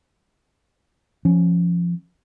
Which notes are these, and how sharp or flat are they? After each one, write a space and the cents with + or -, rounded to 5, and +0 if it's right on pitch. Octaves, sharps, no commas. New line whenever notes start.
F3 -10 C#4 +0